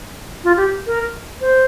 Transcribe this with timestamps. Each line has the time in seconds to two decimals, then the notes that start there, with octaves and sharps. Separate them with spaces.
0.44 F4
0.57 G4
0.87 A#4
1.41 C5